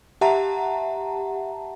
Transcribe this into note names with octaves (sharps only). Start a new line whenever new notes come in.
G4 E5 F#5 A5 A#5